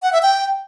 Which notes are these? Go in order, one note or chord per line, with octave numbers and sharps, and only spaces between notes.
F#5
E5
G5